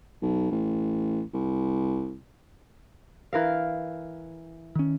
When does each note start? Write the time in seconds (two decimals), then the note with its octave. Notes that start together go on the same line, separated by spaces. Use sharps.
0.22 B1
0.51 A1
1.34 C2
3.33 E3 A#4 F5
4.76 D#3 C#4